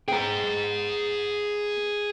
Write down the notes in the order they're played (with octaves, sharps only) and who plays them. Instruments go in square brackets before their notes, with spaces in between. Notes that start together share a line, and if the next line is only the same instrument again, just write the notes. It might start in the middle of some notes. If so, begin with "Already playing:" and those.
[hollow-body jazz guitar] B3 G5 [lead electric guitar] G#4 A#5